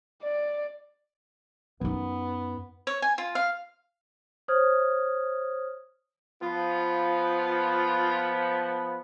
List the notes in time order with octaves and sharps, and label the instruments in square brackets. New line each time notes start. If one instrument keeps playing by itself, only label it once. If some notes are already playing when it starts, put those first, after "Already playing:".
[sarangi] D5
[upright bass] F#2 D#4 [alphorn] B3
[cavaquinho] C#5
G#5
F4
F5
[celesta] C5 C#5 D#6 F6 G#6
[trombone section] F3 B3 [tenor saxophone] F4